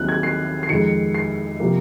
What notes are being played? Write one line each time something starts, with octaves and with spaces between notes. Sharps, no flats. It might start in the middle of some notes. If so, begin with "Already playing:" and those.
Already playing: D#2 D#3 F#3 C4 F#6
G#6
C7
C7
F2 D#3 G#3 C#7
C7
C3 F3 A#3